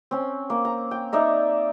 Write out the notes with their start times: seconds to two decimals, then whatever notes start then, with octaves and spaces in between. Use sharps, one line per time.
0.11 C4 C#4
0.50 A#3
0.65 A#5
0.91 G5
1.12 D#4 D5 E5 A#5